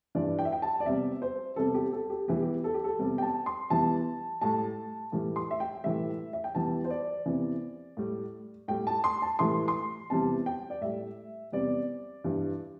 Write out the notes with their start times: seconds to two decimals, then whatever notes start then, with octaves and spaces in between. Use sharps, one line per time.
0.15 G2 E3 G3 D5
0.39 G5
0.45 E5
0.52 G5
0.62 A5
0.80 D5
0.85 E2 C3 G3 E5
1.22 C5
1.56 E2 C3 G3 A4
1.74 G4
1.93 A4
2.10 G4
2.28 E2 E3 G3 G4
2.42 G4
2.64 A4
2.74 G4
2.84 A4
2.99 E2 C3 G3
3.18 G5
3.22 A5
3.46 C6
3.70 E2 E3 G3 A5
4.41 A2 G3 A5
5.12 A2 E3 G3
5.36 C6
5.51 E5
5.60 G5
5.84 A2 E3 G3 E5
6.33 E5
6.44 G5
6.55 E2 E3 G3 A5
6.85 C5
6.90 D5
7.26 E2 C3 E3
7.97 A2 G3
8.68 A2 G3 G5
8.87 A5
9.04 C6
9.22 A5
9.39 A2 E3 G3 C6
9.68 C6
10.10 E2 C3 E3 G3 A5
10.46 G5
10.70 D5
10.81 A2 G3 E5
11.52 E2 C3 G3 D5
12.24 G2 E3 G3